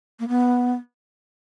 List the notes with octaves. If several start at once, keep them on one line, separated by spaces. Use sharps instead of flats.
A#3
B3